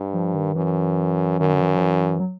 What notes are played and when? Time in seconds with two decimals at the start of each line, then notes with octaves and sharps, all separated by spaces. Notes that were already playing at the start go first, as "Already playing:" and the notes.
Already playing: G2
0.13 F3
0.34 D#3
0.56 F#2 E3
1.40 F#2 D#3
1.54 D3
1.61 E3
1.68 D#3
1.76 F3
1.82 E3
2.20 F#3